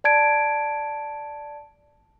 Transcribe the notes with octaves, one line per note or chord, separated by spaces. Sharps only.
D5 A5 G#6 D7